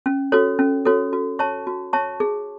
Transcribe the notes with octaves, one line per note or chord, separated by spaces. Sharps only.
C#4
F#4 A4 C#5
C#4
F#4 A4 C#5
F#4
C#5 E5 A5 C#6
F#4
C#5 E5 A5 C#6
G#4